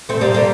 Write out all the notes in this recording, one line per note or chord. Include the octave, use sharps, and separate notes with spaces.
A3 C4
G3 A#3
G3 A#3